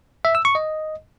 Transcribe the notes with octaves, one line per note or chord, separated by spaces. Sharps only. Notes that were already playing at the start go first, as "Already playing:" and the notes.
E5
E6
C#6
D#5